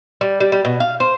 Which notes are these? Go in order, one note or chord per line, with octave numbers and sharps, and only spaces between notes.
G3
G3
G3
B2
F5
C5